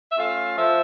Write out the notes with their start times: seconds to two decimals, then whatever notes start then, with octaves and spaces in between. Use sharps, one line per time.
0.11 E5
0.17 A3 C#4 F4 F5
0.58 F3 E5